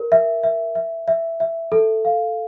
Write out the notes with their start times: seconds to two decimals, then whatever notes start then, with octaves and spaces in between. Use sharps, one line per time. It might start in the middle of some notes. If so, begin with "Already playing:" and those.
Already playing: A#4
0.12 E5
0.43 E5
0.75 E5
1.08 E5
1.40 E5
1.72 A4
2.05 F5